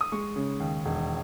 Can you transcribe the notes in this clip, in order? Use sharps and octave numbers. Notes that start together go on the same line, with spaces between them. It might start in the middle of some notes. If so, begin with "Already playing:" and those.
D#6
G#3 C#6
C#3
D#2
E1